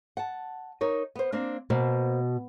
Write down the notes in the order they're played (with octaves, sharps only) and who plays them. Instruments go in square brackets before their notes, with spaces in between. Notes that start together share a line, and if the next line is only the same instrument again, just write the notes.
[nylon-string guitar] F#5 A5
D#4 A#4 C#5
B3 C5
A#3 C4 D4
[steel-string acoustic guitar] B2 [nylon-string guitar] A#3 C5